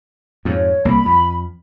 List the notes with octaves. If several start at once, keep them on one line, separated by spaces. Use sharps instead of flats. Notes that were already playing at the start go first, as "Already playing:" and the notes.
F2 G#2 C#5
C2 A#3 B5
F2